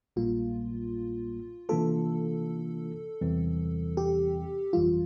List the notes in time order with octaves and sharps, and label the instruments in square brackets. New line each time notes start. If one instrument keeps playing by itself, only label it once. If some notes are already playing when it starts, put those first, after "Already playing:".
[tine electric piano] A#1 A#2 G3 A#3 [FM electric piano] F4
[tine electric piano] C3 E3 A#3 D4 F4 [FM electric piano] A4
[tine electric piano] E2 C3 E3 G3 C4
[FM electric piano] G4
[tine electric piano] G1 F2 E3 G3 [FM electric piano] F4